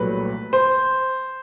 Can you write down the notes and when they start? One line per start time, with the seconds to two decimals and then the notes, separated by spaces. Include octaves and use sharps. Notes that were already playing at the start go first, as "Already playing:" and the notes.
Already playing: C2 A#2 F#3 A3 B4
0.53 C5